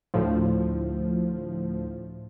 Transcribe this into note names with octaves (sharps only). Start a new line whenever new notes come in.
D2 A2 F3